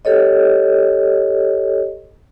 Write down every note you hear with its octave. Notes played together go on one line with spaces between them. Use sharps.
G4 A4 C#5 D#5